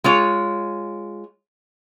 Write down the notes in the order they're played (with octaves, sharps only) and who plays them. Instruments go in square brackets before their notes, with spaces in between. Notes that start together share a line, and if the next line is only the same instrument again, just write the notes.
[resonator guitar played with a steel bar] G#3 F4 C#5